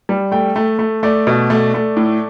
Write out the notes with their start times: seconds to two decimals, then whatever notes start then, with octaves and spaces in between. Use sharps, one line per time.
0.09 G3
0.31 A3 G5
0.56 A3
0.79 A3
1.03 A3 D5
1.27 B2
1.50 A3
1.74 A3
1.97 A2